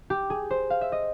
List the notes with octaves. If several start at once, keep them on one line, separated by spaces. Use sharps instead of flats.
G4
G#4
C5
F5
E5
D#5